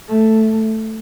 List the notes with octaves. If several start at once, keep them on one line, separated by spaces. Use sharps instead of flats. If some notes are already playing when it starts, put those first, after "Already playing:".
A3